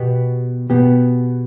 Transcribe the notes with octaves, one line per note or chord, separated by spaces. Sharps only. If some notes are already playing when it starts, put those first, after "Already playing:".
Already playing: B2 B3 G4
B2 B3 G4